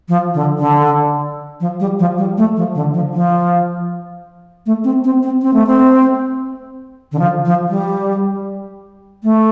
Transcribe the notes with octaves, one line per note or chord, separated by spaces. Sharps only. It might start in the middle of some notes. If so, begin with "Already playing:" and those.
F3
D3
D3
F3
G3
F3
G3
A3
F3
D3
F3
F3
A3
C4
C4
C4
C4
A3
C4
D3
F3
F3
G3
A3